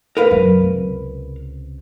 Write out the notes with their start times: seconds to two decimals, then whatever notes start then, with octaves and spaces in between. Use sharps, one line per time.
0.17 A#4 B4 F5
0.31 F#2 C#3
0.60 C#2 C3